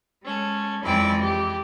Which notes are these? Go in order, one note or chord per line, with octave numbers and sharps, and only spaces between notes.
G#3 C#4 A4
F2 E3 G#3 E4 D5 G5
G4